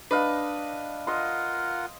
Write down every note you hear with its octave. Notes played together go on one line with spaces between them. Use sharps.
D4 B4 D#5 F5
F4 A#4 D#5 F#5 C6